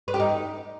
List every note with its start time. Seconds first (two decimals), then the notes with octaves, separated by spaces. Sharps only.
0.08 B4
0.14 G4
0.20 D#4